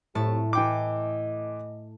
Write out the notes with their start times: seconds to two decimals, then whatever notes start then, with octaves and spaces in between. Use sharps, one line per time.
0.15 F2 A2 A3 C4 G4 A5
0.53 E3 D#5 G5 D6